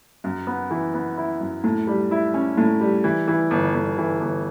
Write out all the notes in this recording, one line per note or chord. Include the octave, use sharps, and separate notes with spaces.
F#2
B3
E3
B3
E4
F#2
A2
G3
E4
C#4
A2
G3
E3
E3
G1
G1
E3
G1